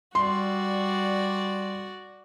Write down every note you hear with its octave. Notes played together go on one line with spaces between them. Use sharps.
G3 F#4 D5 C6